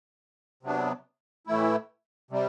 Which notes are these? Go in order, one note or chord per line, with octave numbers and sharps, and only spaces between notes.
C3 F#3 B3 D4
A2 E3 A3 E4
C3 G3